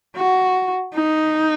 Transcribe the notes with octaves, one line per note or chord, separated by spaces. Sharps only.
F#4
D#4